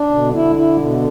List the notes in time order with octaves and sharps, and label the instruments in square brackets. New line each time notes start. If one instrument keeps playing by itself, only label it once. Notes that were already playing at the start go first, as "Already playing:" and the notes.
Already playing: [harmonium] D4
[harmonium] B2 [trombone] D3
[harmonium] E4
E4
B2